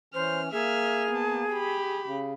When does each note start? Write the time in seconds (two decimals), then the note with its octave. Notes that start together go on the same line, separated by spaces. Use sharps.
0.14 E3 C#4 C5 F6
0.52 A#3 G#4 E5 F6
1.11 B3 A5
1.51 G4 B5
2.05 C#3